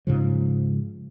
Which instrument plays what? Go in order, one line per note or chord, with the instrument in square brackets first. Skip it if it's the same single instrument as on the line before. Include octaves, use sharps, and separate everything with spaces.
[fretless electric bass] G#2 C#3 F3